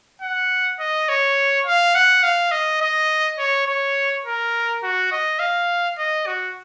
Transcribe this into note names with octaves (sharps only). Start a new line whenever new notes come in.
F#5
D#5
C#5
F5
F#5
F5
D#5
D#5
C#5
C#5
A#4
F#4
D#5
F5
D#5
F#4